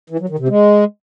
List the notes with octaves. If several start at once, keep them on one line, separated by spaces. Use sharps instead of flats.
E3
F#3
D#3
C3
G#3